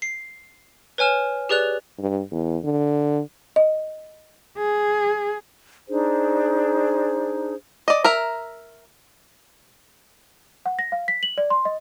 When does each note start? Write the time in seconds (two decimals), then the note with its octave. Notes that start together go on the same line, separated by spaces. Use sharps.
0.02 C7
0.98 B4 C#5 G#5 F6 E7
1.49 G4 G#4 B4 D5 F#6 F7
1.99 G2
2.32 E2
2.65 D3
3.56 D#5
4.58 G#4
5.89 D4 D#4 G#4 C5
7.88 D5 D#5
8.04 A#4 E5 A#5
10.66 F#5
10.79 A#6
10.92 F5
11.08 B6
11.23 F#7
11.38 D5
11.50 C6
11.65 D#5